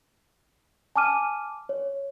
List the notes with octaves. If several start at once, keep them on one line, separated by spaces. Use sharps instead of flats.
G#5 A5 D6 F6 D#7
C#5